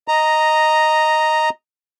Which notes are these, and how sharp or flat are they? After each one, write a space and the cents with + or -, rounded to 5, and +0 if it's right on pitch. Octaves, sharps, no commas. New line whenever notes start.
D#5 +0 A#5 -5